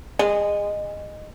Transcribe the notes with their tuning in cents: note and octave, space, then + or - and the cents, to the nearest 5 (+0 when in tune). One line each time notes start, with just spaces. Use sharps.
G#3 -20